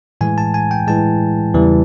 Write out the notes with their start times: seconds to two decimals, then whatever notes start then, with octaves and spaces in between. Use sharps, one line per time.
0.21 A2 E3 G#3 G#5
0.38 A5
0.54 G#5
0.71 G5
0.87 A2 E3 G#3 A5
1.54 E2 C#3 E3 G3